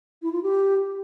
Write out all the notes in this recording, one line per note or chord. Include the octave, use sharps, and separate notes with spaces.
E4
F4
G4